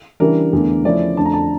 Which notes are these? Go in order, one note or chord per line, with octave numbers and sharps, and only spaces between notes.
C#3 E3 G3 D4 A#4
E2 D3 A3
C#3 F3 A3 C#4 E4 D5
F2 D3 A3 D4 A5
A#5
A5